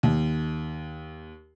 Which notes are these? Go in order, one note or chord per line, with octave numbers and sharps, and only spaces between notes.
D#2